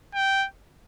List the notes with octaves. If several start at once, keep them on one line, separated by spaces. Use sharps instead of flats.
G5